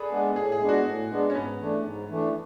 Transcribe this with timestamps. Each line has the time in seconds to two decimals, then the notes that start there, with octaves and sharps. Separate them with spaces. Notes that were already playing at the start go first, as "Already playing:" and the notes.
Already playing: G#4 A4 B4 D5
0.11 G#3 B3 D4
0.36 A2 G#4
0.52 G#4
0.60 G#3 B3 D4
0.69 F#4
0.85 A2
1.10 G#3 B3 D4
1.30 C#4
1.35 G#2 B3
1.60 E3 A3 D4
1.85 G#2
2.10 E3 A3 D4